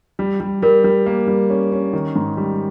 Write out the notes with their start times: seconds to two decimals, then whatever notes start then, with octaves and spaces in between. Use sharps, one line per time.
0.19 G3
0.40 G3
0.62 G3 A#4
0.84 G3
1.06 A#3
1.27 G3
1.50 C#4
1.72 C#4
1.93 D#3
2.16 G#2
2.37 G3